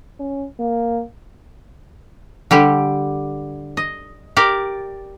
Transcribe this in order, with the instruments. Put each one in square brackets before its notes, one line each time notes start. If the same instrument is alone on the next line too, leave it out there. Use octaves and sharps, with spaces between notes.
[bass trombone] C#4
A#3
[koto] D3 G3 G4
D#5
G4 A#4 D5